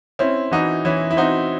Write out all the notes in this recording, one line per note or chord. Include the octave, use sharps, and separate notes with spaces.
C4 C#4 E4
E3 D#4 F#4
E3 C#4 E4
E4
C4 D#4 F#4